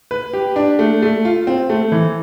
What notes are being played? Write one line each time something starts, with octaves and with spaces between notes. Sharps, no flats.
B4
G4
D4
A3
A3
F4
C4
A3
E3